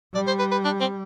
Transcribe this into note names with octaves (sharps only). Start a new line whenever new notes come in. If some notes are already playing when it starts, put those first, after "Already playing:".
G3 D5
C5
B4
B4
D4
C4